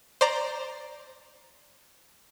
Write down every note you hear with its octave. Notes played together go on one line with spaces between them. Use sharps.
C5 D5 A#5